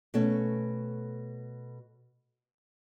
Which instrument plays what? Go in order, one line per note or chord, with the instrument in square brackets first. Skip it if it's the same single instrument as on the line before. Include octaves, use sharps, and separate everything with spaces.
[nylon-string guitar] B2 A3 C#4